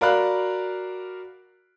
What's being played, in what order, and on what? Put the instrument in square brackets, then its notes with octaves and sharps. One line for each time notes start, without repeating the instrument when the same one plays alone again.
[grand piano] F#4 A#4 D5 F5 B5 F#6